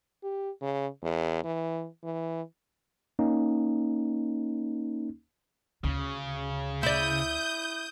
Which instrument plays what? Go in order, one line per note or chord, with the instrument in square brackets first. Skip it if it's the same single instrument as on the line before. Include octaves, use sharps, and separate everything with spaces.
[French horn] G4
C#3
E2
E3
E3
[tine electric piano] A#3 C#4 D#4
[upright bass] D2 [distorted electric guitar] C#3
[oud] E4 D5 [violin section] D#6 G6